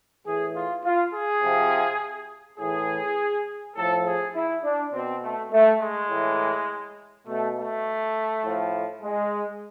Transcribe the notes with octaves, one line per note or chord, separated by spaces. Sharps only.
A2 E3 G#4
F4
F4
G#4
C3 F3
A2 E3 G#4
A2 F3 A4
G#4
E4
D4
B2 C4
A3
A3
G#3
A2 E3
B2 A3
A3
A2 F3
G#3